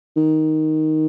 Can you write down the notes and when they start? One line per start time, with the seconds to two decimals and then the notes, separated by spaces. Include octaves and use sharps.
0.17 D#3